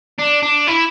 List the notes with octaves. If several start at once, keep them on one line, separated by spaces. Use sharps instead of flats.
D4
D4
E4